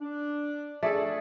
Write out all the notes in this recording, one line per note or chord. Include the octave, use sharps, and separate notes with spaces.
D4
A3 G#4 A4 D5